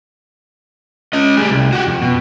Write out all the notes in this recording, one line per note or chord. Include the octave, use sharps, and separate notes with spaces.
C#4 D#5
G3 G#4
C2
F#4 G4
F2
B2